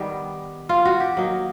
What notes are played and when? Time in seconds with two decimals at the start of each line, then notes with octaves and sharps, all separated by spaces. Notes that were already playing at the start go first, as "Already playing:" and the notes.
Already playing: D#3 G3 B3 G4
0.69 F4
0.85 F#4
1.00 G4
1.17 F#3 A#3 D#4